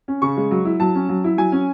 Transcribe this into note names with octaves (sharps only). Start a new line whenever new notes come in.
C#4
C#3 C#6
G#3
F#3
E4
F#3 A5
C#4
F#3
E4
F#3 G#5
C#4